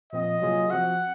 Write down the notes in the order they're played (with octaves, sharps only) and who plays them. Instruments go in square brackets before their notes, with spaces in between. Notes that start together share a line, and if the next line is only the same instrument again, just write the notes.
[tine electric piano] A#2 F3 C4 [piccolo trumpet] D#5
[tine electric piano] C3 F#3 A#3 F4 G#4
[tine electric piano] F3 C4 F#4 [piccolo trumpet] F#5